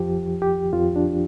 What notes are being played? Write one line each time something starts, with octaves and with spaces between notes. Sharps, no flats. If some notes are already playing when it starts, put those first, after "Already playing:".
Already playing: F2 F3 G4
G4
F2 F3 F4
D4